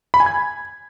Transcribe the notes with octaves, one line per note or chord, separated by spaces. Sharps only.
B5
G#5
G#6